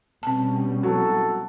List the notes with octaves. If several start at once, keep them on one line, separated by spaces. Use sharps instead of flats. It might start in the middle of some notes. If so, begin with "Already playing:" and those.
B2 G3 C4 C#4 A5
C2 F#3 F#4 A4